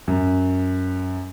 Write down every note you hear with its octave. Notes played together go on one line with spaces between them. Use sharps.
F#2